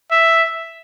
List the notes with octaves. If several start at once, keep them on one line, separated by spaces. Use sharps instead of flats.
E5